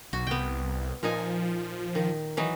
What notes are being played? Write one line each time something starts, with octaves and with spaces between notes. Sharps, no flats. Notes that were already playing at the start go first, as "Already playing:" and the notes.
B1 F#4
C2 B3 G5
A#2 F3 D#4 G#5
D#3
E3 F#3 D#4